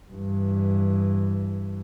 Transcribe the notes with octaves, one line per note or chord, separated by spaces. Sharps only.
G2 E3